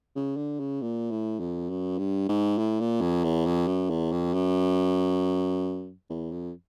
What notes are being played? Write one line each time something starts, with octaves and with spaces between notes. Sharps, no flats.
C#3
D3
C#3
A#2
A2
F2
F#2
G2
G#2
A2
A#2
F2
E2
F2
F#2
E2
F2
F#2
E2
F2